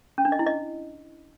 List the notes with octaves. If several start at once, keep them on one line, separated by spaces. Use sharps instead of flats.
C#4
D4
D#5
E4
D#5